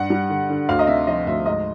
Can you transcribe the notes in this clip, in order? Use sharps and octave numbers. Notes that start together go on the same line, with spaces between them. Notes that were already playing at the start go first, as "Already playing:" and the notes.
Already playing: G2 F#5
G3
D3
D3
D2 F5
D#5
C3 E5
F3 D#5
D2 E5
G#2 D#5